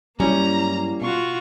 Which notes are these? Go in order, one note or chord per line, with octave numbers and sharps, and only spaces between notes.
G2 F#3 G3 A#3 C#4 E4 A#5
B2 F4 F#4 C#6